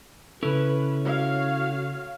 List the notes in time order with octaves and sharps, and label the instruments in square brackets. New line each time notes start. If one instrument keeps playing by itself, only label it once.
[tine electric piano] C#3 A4 [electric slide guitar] C#4 E4 [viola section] B4
[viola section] F#4 C#5 F5